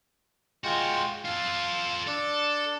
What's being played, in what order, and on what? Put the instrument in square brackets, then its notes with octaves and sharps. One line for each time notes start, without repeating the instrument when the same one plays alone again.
[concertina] G#3 F4 G5 [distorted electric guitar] F#4 C5
[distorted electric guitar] F4 A4 [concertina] F5
[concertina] D4 D5 [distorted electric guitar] A4